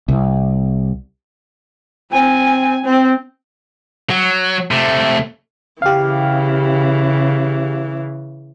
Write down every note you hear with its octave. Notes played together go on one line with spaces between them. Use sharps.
C2
C4 G#5
C4
F#3
C3 A3
C#3 E3 G4 F5